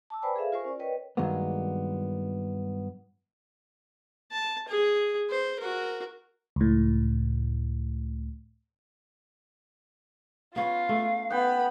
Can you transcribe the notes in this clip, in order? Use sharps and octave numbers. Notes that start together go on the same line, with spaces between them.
A5 D6 E6
B4 C5 D5 G5 G#5 B5
G#4 A4 E5 F5
F4 A#4 C5 G#5 C#6
C#4 D5
A#4 B4 C#5 D#5 G5
G2 D#3 F#3 G#3 A#3 B3
A5
G#4
C5
F#4 A#4
C#2 A2
B3 C#4 F4 F5
A3
B3 F#5 G5 B5